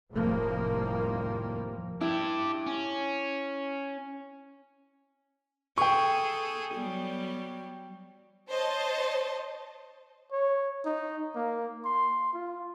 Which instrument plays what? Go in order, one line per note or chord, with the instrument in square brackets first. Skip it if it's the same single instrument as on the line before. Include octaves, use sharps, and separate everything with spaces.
[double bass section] F1 D#2 A2 F3 G3 A#3
[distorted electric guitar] D4 G4 [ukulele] E4
[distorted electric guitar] C#4
[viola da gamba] G#4 A4 [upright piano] G5 C#6
[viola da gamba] F#3 G3 B3
[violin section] C5 C#5 D#5 A5
[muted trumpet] C#5
D#4
A#3
C6
F4